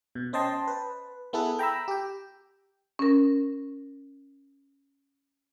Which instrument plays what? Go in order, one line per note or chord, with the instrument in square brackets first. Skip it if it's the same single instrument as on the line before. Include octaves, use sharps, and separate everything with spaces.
[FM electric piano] B2
C#4 C5 D#5 G5 A5 C6
B4
B3 E4 G#4 A4 B4
G5 A#5 B5 E6
G4 G5
[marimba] C#4 A#4